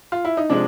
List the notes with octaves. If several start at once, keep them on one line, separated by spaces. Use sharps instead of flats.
F4
E4
D#4
C3 F3 G#3 D4